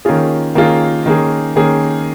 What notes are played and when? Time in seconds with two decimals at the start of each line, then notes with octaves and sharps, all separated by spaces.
0.05 D#3 A#3 C#4 F4 G#4
0.55 D#3 A#3 C#4 F4 G#4
1.06 D#3 A#3 C#4 G#4
1.56 D#3 A#3 C#4 G#4